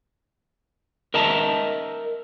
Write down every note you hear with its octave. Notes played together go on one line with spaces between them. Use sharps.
A#4 D#5 E5 A5 A#5